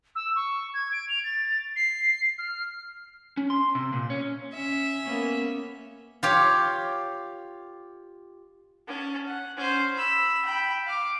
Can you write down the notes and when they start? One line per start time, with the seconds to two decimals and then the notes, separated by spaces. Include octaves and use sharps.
0.15 E6
0.36 C#6
0.74 G#6
0.92 D7
1.09 F7
1.24 A6
1.76 C7
2.39 F6
3.37 C#4
3.50 C6
3.75 C3
3.93 A#2
4.10 C#4
4.54 C#4 E5
5.03 A#3 B3 C#4
6.23 F4 G4 C#5
8.88 C#4 A5
9.26 F#5
9.57 C#4 C5
9.94 B5 E6
10.45 G5 B5
10.86 F5 D6